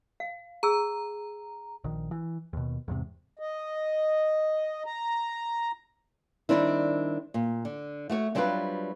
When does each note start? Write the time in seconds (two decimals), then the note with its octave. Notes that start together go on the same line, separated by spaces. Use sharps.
0.20 F5
0.63 G#4 A#5 E6
1.84 A#1 D#3
2.11 E3
2.53 D#2 B2
2.88 E2 G#2 C3
3.39 D#5
4.86 A#5
6.49 D#3 F3 G3 C4 D4 E4
7.34 A#2
7.65 D3
8.10 A3 F#4 C#5
8.35 F#3 G3 C4 D4 F4 B4